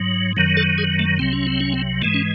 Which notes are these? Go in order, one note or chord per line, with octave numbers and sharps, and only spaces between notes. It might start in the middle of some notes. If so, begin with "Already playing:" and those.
Already playing: G#2 F#3
F#2 D#3 F#3
A4
G#4
A3
C2 C3 F#3 C4
C#4
C4
C#4
C4
G#2 E3 G#3 A3
C#4